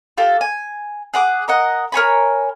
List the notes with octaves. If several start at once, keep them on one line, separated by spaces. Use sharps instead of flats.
F4 G4 A4
G#5
G#4 F#5 D6
A#4 D#5 F#5
A#4 C#5 G#5 B5